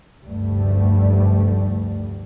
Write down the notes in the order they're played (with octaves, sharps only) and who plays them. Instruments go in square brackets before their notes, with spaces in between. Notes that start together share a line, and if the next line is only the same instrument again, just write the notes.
[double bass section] F1 D2 G2 G3 A3